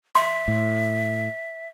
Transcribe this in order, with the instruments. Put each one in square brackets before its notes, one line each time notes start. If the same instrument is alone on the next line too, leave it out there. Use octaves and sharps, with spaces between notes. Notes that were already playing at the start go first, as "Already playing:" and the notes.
[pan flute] E5 [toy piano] C6
[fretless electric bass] A2